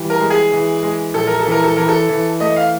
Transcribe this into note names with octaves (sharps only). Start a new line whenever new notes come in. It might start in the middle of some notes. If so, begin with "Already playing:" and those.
Already playing: E3 G3
A#4
G#3
G#4
E3
G#3
A#1 A4
A#4
A4
E3
A#4
A4
E3 A#4
A4
E3
A3 D#5
F5